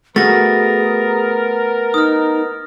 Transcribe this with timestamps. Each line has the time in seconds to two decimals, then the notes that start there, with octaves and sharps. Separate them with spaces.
0.16 A3 B3 F#4 G#4 A#4 A6 A#6
1.94 D#4 D#6 F6